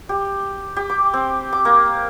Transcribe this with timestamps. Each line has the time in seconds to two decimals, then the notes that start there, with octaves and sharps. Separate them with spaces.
0.09 G4
0.76 G4
0.90 D6
1.13 C4
1.53 D6
1.65 A#3